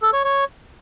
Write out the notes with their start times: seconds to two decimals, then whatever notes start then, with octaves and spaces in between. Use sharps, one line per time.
0.02 A4
0.13 C#5
0.24 C#5